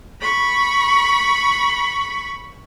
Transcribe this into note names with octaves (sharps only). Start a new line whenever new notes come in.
B5 C#6